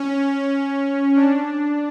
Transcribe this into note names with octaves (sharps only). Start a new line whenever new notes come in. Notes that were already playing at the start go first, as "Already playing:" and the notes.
Already playing: C#4
D4